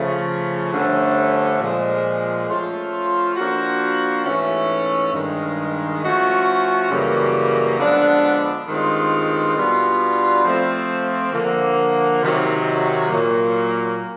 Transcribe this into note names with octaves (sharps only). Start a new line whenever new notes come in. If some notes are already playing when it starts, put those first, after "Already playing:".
Already playing: C#3 F3 A3
G2 D3 F3 A3 C#4
A#2 F3 G#3
F3 A3 C#4 F4
F3 A#3 D4 F#4
G#2 E3 A3 C#4
G2 D#3 G#3
F3 A3 C#4 F#4
F#2 C#3 E3 G3 A#3
D3 F3 G#3 B3 D4
G2 D#3 G#3 C4 F4
B2 G3 B3 D4 F4
F3 A3 C4
D3 F3 A#3
C3 D#3 F#3
A#2 F#3 A#3